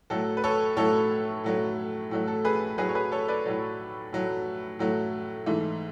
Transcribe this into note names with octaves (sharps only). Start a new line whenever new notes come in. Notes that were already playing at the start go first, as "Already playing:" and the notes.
A2 F#3 A3 A4
B4
A4 C#5
A2 F#3 A3 A4 C#5
A2 F#3 A3
A2 F#3 A3
A4
G#4 B4
A2 F#3 A3 G#4 B4
C#5
G#4 B4
A4 C#5
B4 D5
A2 F#3 A3
A2 F#3 A3
A2 F#3 A3
G#2 E3 A3